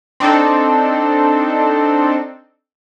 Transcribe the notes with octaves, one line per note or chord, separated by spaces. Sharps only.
C4 D4 D#4 A4